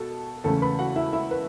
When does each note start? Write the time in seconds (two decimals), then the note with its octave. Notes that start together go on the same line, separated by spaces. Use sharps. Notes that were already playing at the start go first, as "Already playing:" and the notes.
Already playing: B2 A4 A5
0.44 E2 C#3 A3 C#4 A4 A5
0.62 B4 B5
0.79 F#4 F#5
0.96 E4 E5
1.13 E4 E5
1.31 B4